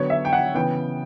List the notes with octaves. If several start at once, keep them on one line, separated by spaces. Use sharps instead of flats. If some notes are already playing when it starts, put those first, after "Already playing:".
Already playing: D3 F#3 B3 C#5
E5
G5
F#5
C#3 E3 B3 G5